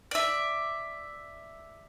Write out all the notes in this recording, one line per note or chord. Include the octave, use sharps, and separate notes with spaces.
D5 E5